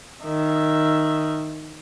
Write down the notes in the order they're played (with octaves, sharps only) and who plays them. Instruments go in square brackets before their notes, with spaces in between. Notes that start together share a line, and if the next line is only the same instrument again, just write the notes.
[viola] D#3 E5